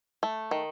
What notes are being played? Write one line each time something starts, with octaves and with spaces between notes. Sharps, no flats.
A3
D#3